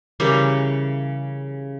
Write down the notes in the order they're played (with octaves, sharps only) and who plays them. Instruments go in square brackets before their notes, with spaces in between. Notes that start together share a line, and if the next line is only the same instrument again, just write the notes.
[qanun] C#3 E3 G3 A#4